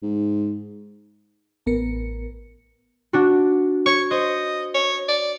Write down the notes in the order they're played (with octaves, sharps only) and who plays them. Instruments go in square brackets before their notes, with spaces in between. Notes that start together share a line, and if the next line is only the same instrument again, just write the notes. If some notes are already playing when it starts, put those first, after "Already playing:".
[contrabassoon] G#2
[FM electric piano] A1 B3 A#4 C#7
[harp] D4 F#4
[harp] C#5 [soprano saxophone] C#6
[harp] C5 [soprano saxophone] D#5
[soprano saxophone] C#5
D5